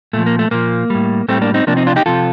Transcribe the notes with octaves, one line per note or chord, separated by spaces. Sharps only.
A#2 F3 A3
A#3
A3
A#2 F3 A#3
A2 G3
A2 G3 A3 C4
A#3 D4
C4 D#4
C3 F3 A#3 D4
C4 D#4
D4 F4
D#4 G4
C3 F3 F4 A4